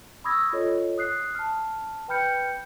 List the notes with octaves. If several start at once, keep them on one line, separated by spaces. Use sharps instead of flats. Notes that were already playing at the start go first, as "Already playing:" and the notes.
B5 C#6 D#6 E6 G#6 A#6
F4 A4 C#5 D#5
D#6 F#6 C7
A5 F6
B4 G5 B5 F6 G6 C#7